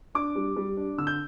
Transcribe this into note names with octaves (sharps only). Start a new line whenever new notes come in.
D4 D6
G3
G3
D4
D3 E6
G6